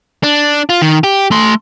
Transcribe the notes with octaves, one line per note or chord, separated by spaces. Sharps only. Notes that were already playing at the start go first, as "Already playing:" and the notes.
D4
F4
D#3
G4
A3 C6